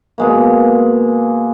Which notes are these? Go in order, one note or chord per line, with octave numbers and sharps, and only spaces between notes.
B2 G#3 A#3